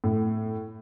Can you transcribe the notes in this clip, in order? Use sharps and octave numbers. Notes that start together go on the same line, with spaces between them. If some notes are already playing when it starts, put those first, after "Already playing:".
A2